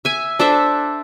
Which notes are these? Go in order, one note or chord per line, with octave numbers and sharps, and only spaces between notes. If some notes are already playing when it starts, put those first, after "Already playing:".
E5 G#5
D4 A4 C5 E5